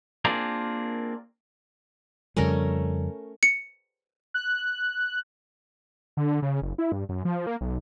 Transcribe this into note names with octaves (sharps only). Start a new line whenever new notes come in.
A#3 C4 D4 F4 G#4 A#4
F2 C#3 G3 A3 C#4 A#4
C#7
F#6
D3
C#3
F#1
E4
G2
F#2
F3
A#3
B1